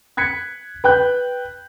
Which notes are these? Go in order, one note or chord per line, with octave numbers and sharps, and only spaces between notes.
F#6 G#6 B6 C#7
B4 G5 F#6 G6